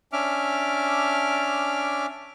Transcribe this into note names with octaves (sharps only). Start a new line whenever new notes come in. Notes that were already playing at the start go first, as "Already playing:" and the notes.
C#4 D4 E5 D6 F6